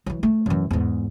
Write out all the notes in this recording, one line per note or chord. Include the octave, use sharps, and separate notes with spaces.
E3 F#3
A3
F#2 E3
E2 G#2